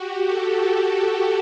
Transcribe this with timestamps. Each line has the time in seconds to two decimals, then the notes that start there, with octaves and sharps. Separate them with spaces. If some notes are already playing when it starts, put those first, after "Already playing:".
Already playing: F#4 G4
0.23 A4